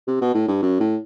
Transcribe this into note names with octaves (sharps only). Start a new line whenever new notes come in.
C3
B2
A2
G2
F#2
A2